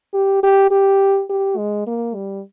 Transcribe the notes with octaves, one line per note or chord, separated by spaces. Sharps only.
G4
G4
G4
G4
G#3
A#3
G3